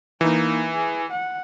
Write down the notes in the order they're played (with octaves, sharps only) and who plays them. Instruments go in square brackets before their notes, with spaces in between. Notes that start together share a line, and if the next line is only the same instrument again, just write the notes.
[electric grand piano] E3 [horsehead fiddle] A#3 D#4
[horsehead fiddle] G#4
F#5